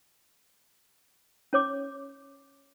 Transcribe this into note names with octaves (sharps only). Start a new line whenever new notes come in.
C#4 C#5 D6